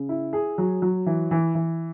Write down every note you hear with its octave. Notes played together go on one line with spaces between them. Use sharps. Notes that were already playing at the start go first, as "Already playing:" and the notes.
Already playing: C#3
E4
G#4
F#3
F#3
E3
E3
E3